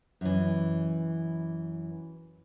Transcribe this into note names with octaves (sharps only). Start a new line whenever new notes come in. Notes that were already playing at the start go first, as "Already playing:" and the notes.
F#2 E3